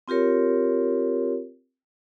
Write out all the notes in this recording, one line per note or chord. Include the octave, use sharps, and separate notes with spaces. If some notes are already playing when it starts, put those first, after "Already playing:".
C4 F4 G4 A#4 C#5